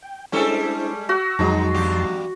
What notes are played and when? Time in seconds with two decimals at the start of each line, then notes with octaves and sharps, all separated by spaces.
0.02 G5
0.32 G3 G#3 C#4 D4 E4 G#4 A4 C5
1.09 F#4 E6
1.39 F2 D#3 F#3 G#3 D#4 A5 C6
1.74 E2 G2 G4